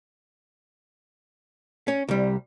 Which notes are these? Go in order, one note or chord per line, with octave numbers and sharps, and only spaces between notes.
C#4
C2 G3